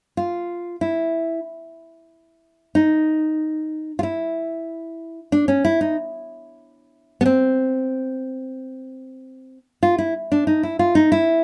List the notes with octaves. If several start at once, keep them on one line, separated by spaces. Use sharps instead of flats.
F4
E4
D#4
F4
E4
D4
C#4
E4
D#4
B3
C4
F4
E4
D4
D#4
E4
F4
D#4
E4